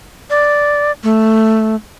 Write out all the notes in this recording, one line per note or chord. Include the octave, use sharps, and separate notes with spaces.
D5
A3